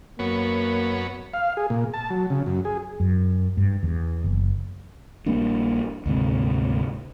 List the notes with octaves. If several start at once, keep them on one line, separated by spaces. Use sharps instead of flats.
F#2 A#3 B3 C#5
F5
G#4
A#2
A5
F#3
C#3
F#2
G#4
F#2
G2
E2
F#1
A#1 G3 A#3 D4
D2 G#2 C3